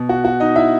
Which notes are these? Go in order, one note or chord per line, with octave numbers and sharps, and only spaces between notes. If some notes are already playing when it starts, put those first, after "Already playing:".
Already playing: B2
F#4
F#4
D#4 D#5
E4 E5